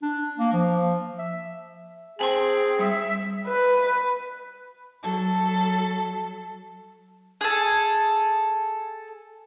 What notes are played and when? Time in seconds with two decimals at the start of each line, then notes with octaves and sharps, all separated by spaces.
0.02 D4
0.38 A#3
0.53 F3
1.18 E5
2.19 C4 G#4 G#5 A5 C6
2.79 G3 E5
3.48 B4
5.02 F#3 A4
7.41 G#4 A4